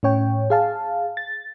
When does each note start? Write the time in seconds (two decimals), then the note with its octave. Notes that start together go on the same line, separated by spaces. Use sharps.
0.03 A2 C#4 C#5 G5
0.50 G#4 F5 A5
1.17 A6